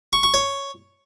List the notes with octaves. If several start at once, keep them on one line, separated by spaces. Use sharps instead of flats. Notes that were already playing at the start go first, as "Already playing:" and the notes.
C#6
C#6
C#5